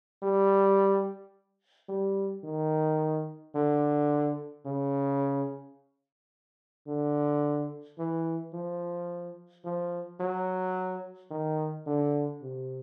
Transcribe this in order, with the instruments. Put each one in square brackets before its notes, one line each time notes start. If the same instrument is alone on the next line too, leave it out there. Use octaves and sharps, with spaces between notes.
[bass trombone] G3
G3
D#3
D3
C#3
D3
E3
F3
F3
F#3
D#3
D3
C3